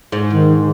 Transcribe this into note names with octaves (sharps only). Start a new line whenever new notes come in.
G#2
D#3